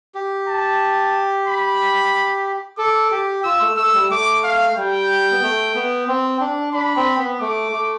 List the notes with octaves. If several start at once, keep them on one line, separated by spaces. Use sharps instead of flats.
G4
A5
B5
A4 D6
G4
F4 E6
A3
A3 E6
G3
A3 D6
F5
G3 G5
B3
A3
B3
C4
D4
D4 B5
C4
B3
A3 D6
A3